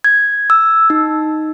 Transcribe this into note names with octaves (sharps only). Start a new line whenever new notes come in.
G#6
E6
D#4